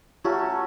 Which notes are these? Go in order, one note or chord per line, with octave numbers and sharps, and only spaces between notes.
F#3 A3 C#4 F4 G4